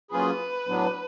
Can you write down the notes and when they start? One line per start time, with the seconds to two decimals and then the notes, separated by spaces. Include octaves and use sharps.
0.11 F#3 A#3 C#4 F4 G#4 B4
0.67 A2 F#3 B3 D4